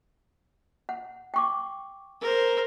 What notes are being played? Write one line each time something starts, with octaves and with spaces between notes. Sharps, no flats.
F#5
G5 C#6 D6
A#4 C5